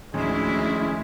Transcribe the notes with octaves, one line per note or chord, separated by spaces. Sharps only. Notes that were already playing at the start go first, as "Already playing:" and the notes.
D2 A2 D#3 F3 G#3 C#4 E4